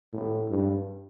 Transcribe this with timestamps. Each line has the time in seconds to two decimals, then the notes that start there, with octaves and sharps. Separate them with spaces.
0.13 A2
0.50 G2